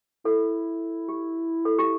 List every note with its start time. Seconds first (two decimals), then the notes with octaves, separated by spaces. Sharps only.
0.24 E4 A4
1.09 G4
1.65 A4
1.78 G4